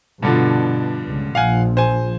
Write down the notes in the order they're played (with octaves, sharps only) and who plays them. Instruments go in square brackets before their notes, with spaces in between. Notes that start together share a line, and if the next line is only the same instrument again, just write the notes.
[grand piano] G2 D3 F3 [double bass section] B2
[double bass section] C#2
[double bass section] A#1 F3 [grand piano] F5 F#5 G#5
[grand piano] C5 G#5